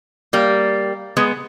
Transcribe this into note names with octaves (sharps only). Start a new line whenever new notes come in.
G3 A#3
G#3 B3